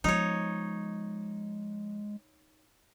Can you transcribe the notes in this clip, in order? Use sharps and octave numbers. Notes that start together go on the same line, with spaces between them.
F3 G#3 B3 D#4 C#5